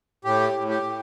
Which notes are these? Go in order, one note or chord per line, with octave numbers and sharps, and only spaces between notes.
A2 G4
A2
G4
A2